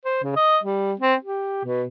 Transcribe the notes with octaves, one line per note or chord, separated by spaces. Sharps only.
C5
C#3
D#5
G3
C4
G4
B2